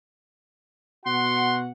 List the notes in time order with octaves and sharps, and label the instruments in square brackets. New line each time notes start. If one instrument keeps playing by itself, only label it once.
[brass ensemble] B2 F#4 F#5 [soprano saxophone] C6